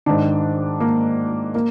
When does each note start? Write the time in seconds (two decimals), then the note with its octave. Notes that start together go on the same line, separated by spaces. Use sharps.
0.06 G#2 D#3 D4
0.80 A#3
1.55 A#3